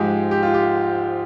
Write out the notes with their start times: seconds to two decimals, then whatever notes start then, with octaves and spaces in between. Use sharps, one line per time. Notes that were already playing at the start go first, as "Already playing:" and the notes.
Already playing: G#2 F3 G#3 G4
0.31 G4
0.43 F4
0.54 G4